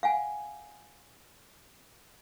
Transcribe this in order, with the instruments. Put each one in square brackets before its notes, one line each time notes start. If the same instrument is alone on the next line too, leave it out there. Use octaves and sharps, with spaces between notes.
[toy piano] F5 F#5 G#5